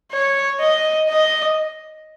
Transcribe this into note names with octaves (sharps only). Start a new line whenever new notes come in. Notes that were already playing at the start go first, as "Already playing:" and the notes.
C#5
D#5
D#5